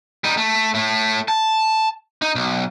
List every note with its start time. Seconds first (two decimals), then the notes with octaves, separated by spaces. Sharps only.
0.24 G3 D#4
0.37 A3
0.74 A2 A3
1.28 A5
2.22 D#4
2.35 B1